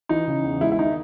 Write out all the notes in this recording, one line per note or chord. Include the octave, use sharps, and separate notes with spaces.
E3 D#4
C#3
E2
G#3 E4
E4
D#3 D#4